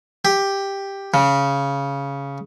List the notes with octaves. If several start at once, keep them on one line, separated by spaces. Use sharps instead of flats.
G4
C#3